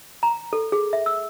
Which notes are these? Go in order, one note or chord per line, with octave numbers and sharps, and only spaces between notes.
A#5
A4
G#4
E5
E6